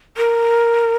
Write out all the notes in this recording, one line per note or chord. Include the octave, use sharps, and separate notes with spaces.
A#4